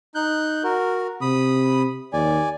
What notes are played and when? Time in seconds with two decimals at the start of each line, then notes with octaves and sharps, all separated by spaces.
0.15 D#4 F#6 G6
0.64 F#4 A#4
1.21 C3 B5 D#6
2.13 D#2 D5 G#5